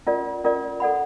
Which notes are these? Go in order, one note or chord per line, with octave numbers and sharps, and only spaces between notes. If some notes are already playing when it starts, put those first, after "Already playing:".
C#4 F4 A#4 D5
C#4 F4 A#4 D5
A4 D5 F#5 B5